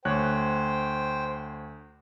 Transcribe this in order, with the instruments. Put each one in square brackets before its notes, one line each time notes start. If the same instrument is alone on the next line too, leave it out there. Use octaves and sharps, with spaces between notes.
[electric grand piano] D2 C#5 F#6 [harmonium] C5 G5